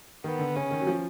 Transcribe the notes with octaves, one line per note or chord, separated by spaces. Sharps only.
D#3 B3
D3
C#3 C#4
D#3
F#3
F3